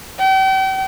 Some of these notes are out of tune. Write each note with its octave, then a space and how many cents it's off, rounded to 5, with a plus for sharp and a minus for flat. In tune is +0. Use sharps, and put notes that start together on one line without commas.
G5 -40